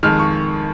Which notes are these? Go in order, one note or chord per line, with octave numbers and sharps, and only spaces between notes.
F2 D#3 G#3 F6
C#6